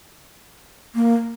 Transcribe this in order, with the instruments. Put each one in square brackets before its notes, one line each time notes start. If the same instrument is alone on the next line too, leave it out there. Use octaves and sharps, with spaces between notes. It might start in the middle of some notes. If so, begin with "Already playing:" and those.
[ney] A#3